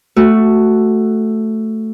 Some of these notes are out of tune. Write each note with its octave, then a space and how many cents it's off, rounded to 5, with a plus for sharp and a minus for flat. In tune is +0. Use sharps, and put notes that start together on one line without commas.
A3 +0 F#4 +0